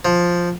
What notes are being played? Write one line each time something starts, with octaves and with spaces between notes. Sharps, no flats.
F3